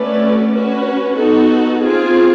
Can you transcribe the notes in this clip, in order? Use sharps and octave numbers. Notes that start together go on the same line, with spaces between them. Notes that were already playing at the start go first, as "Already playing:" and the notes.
Already playing: A3 C#4 F#4 B4 D5
C#4 F#4 B4
B3 D#4 F#4 A4
C4 F4 G#4